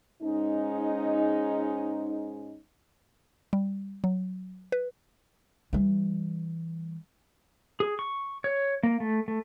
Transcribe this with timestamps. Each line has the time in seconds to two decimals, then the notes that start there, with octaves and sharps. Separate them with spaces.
0.22 G#2 G#3 C#4 D#4
3.53 G3
4.04 F#3
4.72 B4
5.73 E3 G3
7.80 G#4
7.99 C#6
8.44 C#5
8.83 A#3
9.00 A3
9.28 A3